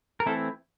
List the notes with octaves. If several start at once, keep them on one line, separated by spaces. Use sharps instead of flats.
A#4
E3 A3 C4 E4 A4